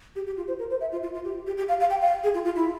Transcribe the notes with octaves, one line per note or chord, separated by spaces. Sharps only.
G4
G4
F4
C5
A#4
C5
E5
F4
F4
F4
G4
G4
G4
F5
F5
G5
F5
G#4
F4
F4
E4